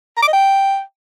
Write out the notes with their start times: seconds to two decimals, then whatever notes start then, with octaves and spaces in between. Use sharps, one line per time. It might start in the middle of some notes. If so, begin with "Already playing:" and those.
0.17 A#5
0.23 D6
0.28 D#5
0.33 G5